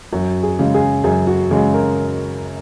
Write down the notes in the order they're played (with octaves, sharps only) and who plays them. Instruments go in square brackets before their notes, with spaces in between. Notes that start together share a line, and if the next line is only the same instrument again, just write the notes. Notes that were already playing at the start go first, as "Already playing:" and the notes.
[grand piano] F#2 F#4
G#4
C#3 G#3
G#4
F#2 G#4
F#4
C#3 G#3
A#4